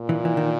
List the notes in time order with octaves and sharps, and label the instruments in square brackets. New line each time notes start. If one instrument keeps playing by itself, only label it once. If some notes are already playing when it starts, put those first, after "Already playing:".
Already playing: [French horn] A#2
[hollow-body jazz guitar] E3
E3
D#3